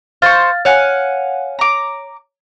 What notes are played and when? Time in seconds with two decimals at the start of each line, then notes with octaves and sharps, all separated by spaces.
0.22 C5 F5 C#6 F6 A6
0.65 C#5 F5 F#5 G#5
1.59 A#5 D6